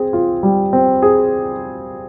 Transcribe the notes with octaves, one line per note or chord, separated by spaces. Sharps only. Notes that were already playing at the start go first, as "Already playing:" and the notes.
Already playing: C4 G#4
F4
G3
C4
G#4